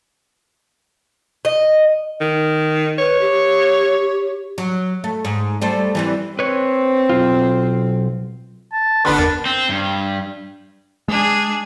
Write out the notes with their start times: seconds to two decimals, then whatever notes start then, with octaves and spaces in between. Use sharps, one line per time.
1.45 D#5
2.20 D#3
2.98 B4 C#5
3.21 G4
4.58 F#3
5.04 A3
5.25 G#2
5.62 G3 A3 C5
5.95 E3 G3 C4
6.39 C4 B4 C#5
7.09 B1 F4
8.72 A5
9.05 G1 D3 B3 D4 B4 C6
9.18 E2 A#4 A5
9.46 C4
9.69 G2
11.08 G#3 D4 G#4